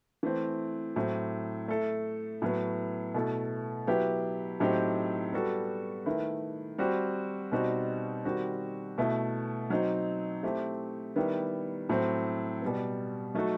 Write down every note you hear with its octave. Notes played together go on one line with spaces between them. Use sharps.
E3 A3 C4
A2 F#3 C4
A3 E4 A4
A2 F#3 B3
B2 A3 E4 A4
F#3 B3 E4 G4 B4
A2 F#3 C4 D#4 G4
G3 B3 F#4 A4
D#3 A3 E4 B4
G3 C4 F#4
B2 G3 C4 D#4 F#4
D#3 G3 C4 F#4
B2 A3 E4
F#3 C4 D#4
A3 C4 E4 G4
D#3 G3 B3 E4
A2 F#3 C4
B2 G3 B3
F#3 A3 D#4 F#4 A4